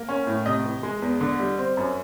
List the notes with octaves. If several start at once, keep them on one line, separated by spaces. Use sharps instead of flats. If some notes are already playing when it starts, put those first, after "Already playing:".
Already playing: A#3
C#4
A2
C3 D#5
E3
G#3
E2
D3
G3
C4
F#2